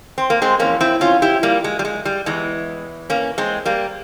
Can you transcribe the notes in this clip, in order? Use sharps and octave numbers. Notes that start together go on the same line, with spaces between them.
C4
A#3
G#3 C4
F2 E3 A#3 C#4
C4 E4
C#4 F4
E4 G4
G3 A#3
G#3
G3
G#3
G3
E2 E3 G#3
A#3 C#4
G#3 C4
G3 A#3